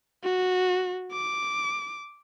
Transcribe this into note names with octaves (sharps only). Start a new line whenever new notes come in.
F#4
D6